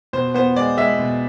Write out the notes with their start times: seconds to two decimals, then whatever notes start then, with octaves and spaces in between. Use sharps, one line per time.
0.13 B2 C5
0.34 B3 C5
0.56 G#3 D5
0.77 G#3 E5
0.99 B2